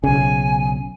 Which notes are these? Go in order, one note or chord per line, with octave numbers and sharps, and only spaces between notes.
B1 C#3 G#5